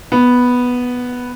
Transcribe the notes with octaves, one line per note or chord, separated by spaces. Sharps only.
B3